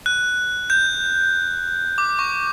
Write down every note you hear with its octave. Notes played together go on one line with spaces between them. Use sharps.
F#6
G6
D6
C#6